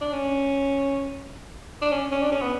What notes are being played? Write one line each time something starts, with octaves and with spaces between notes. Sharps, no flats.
D4
C#4
D4
C#4
C#4
D4
C#4
B3